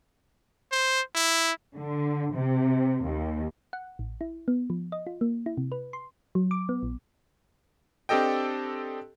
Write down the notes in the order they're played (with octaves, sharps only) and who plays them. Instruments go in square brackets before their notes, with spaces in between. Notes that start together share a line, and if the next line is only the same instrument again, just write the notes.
[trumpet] C5
E4
[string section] D3
C3
D#2
[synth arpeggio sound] F#5
A1
E4
B3
F3
D#5
F4
A#3
E4
C3
B4
C6
[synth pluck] F#3
D6
B3
A#1
[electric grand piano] C4 D4 G4 A4 D#5 G5